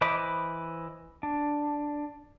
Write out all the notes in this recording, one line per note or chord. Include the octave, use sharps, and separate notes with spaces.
E3 C5 D#5 B5 D6
D4